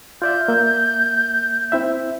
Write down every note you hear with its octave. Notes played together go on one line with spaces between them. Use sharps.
F4 D5 E5 G6
A#3 E5
C4 E4 E5